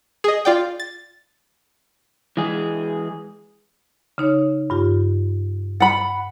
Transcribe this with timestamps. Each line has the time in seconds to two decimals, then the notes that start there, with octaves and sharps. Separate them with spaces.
0.24 G#4 D#5
0.45 F4 D5 G5
0.80 A6
2.37 E3 G#3 G#4
4.18 C#3 D#4 C#5
4.70 G2 F4 G4
5.80 F#5 B5 A6